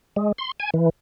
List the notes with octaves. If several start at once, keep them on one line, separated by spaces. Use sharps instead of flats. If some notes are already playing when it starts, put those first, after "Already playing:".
G#3
C6
G#5
E3